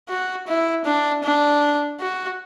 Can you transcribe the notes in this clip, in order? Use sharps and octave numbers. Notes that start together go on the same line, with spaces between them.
F#4
E4
D4
D4
F#4